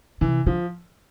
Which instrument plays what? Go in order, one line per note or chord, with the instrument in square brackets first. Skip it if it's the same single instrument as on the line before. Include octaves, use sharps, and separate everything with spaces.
[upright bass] C3 [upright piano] E3
[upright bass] D3 [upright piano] F3